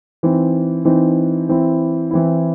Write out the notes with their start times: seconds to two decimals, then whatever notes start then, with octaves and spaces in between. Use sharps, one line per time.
0.23 E3 C4 D#4
0.85 E3 C4 D#4
1.49 E3 C4 E4
2.11 E3 C4 E4